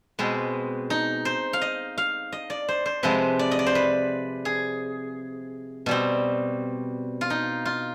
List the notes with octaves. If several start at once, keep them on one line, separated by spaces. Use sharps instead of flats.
B2 G#3 C4 B4
D#4
C5
F5
D#5
F5
D#5
D5
C5
C5
C3 F3 G#3 C4 B4
D5
D#5
D5
C5
B4
G#4
B2 G3 C4
F4
D#4
F4